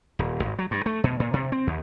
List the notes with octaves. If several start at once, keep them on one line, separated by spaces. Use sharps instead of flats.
D#1
G#1
F#3
G2
A3
B2
A#2
C3
C4
D#2